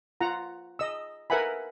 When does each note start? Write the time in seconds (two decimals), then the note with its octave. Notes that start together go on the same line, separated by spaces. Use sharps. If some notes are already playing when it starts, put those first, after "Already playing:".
0.21 F4 F#5 A#5
0.79 D#5 E6
1.30 A#4 B4 E5 F#5 G#5 B5